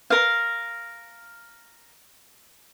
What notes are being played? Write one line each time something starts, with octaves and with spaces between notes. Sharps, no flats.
A#4 F5